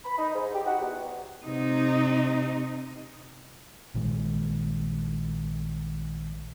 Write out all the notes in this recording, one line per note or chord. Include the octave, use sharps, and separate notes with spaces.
B5
D#4
G#2
G4
D#4 F#4 F#5
E2
C3 D#4
A#1 A#2 D#3 G#3